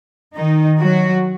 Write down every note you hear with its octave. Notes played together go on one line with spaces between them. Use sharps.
D#3 D#4
F#3 F#4